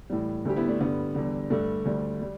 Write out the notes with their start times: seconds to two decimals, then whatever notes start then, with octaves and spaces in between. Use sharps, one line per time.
0.10 A2 E3 G3
0.45 D2 D3 G3 G4
0.56 B3 E4
0.68 A3 D4
0.80 G2 D3 G3 B3
1.15 E2 D3 G3
1.50 G2 D3 G3 A3 D4
1.85 D2 D3 G3
2.21 G3